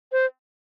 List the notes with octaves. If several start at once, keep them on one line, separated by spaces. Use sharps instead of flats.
C5